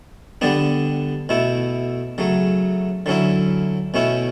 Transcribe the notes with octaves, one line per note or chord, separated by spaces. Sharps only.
D3 G3 B3 D4
B2 A3 E4
C#3 F#3 A3
D3 F#3 C#4 E4
B2 A3 C#4 E4